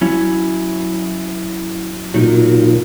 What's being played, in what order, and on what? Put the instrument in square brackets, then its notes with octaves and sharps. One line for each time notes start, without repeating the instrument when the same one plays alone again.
[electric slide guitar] F#3 C#4 E4
[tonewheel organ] A#2 [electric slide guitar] F#3 D#4 A#4